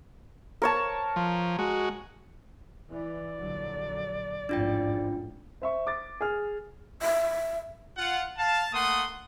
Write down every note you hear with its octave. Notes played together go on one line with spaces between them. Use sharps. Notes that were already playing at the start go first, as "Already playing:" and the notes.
A#4 C#5 A5
F3
G#3 F#4
E3 D5
A#1 D3 F#3
A1 F2 G#2 D4 F4 G5
C5 E5 C#6
D6 A6
G#4 F6
E5
F4 F#5
F5 A5
A3 A#3 F#5 C6 D#6